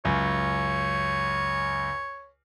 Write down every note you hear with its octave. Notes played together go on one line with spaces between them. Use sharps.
C#2 F#2 C#5